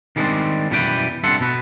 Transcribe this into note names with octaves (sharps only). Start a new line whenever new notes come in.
D#3 G3 G#3 C4 D4
F#2 B2 E3 G3 B4 G5
G2 C3 A4 E5 F#5 C6
B2 B4